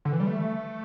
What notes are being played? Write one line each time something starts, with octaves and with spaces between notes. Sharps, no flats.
D3
E3
G3
A3